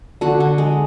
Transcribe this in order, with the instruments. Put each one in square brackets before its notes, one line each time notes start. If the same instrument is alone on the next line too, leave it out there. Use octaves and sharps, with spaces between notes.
[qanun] D3 F#4
D3
G#3